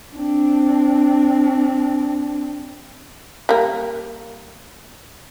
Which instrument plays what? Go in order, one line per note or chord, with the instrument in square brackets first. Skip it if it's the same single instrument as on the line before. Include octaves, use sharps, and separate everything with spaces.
[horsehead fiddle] C4 D4
[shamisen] G3 A#3